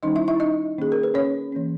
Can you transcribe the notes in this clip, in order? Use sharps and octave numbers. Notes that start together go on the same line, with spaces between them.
D#3 G3 C#4 D#4 D#5
E4 E5
E4 E5
D#4 D#5
D#3 A#3 C#4 G#4
A#4
B4
C#4 C#5
E3 A#3 C#4